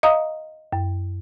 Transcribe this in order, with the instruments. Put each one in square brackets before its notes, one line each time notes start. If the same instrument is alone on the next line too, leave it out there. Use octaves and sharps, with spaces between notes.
[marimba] D#5 F5 A#5 D#6
F#2